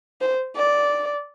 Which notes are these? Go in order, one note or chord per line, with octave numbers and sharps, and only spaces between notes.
C5
D5